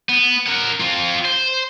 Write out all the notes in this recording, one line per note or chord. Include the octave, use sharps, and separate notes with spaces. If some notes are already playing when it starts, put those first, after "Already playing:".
B3
A#4 F#5
C4 F4
C5